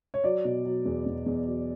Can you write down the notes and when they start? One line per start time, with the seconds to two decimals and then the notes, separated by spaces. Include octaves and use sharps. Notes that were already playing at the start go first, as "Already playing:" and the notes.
0.14 C#5
0.24 F#3 D5
0.45 B2
0.65 F#3
0.85 E2
1.06 E2
1.26 E2
1.47 F#3